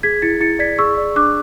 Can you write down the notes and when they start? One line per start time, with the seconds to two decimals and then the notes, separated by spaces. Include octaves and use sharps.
0.03 G#4 G#6 B6
0.22 E4 A6 C#7
0.40 E4 A6 C#7
0.59 D5 G#6 B6
0.78 G#4 C#6 E6
0.97 D5
1.16 D4 D6 F#6